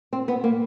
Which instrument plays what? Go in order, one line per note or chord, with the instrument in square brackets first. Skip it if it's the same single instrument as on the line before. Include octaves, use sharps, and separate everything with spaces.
[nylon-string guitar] C4
B3
A#3